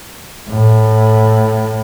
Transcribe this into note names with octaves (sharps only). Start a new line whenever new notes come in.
A2